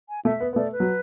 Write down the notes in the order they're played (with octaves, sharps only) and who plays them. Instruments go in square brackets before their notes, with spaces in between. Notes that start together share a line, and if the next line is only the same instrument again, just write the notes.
[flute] G#5
[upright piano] A3 [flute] E5
[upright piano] B3
B3
[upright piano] A3 [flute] D5
[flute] B4
[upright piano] F#3